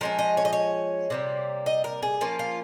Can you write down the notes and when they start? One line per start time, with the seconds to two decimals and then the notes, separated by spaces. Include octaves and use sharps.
0.01 F3 G#3 C#4 A#4
0.19 D#5
0.37 C#5
0.45 D#5
0.53 C#5
1.10 C3 G3 A#3
1.66 D#5
1.84 A#4
2.03 G#4
2.21 F3 A#3 C#4 F4
2.39 F4